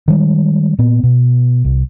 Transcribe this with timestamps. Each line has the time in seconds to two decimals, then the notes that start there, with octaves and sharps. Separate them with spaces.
0.08 D#3 G3 G#3
0.79 A#2 B3
1.03 B2
1.65 C2